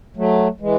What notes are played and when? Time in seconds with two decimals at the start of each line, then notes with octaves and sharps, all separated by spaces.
0.17 F#3 A3
0.61 E3 G#3